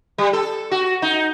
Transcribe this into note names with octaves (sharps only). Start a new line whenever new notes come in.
G3
A4
F#4
D#4